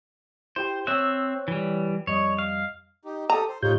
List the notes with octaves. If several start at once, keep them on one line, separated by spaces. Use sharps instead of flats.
E4 G4 C5 G5
C4 C#5 E5 E6 F#6
E3 G3
F2 G3 C#5 D#5
F5
D#4 G4
G4 A4 A#5 D#6
C5
A2 D#4 F4 G4 C#5 G6